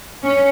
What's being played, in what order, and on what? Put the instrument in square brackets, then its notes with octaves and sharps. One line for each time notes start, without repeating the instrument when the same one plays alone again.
[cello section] C#4